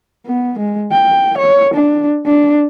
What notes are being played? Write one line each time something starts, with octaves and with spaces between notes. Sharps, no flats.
B3
G#3
G5
C#5
D4
D4